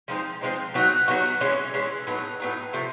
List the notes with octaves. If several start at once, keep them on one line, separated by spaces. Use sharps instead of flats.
F3 G#3 C4 D#4
F3 G#3 C4 D#4
F#3 B3 D#4 F#4
F#3 B3 D#4 F#4
E3 G#3 C#4
E3 G#3 C#4
A2 F#3 B3 D#4
A2 F#3 B3 D#4
C3 F3 A3